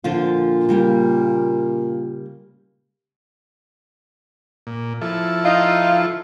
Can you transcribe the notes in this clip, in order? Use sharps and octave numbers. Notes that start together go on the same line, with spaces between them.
A#2 D3 F3 F4
C#3 G3 A#3
A#2
F3 E4 A4
D#4 F4